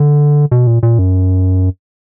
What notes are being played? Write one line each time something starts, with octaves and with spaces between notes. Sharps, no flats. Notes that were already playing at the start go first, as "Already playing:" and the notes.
Already playing: D3
B2
A#2
A#2
F#2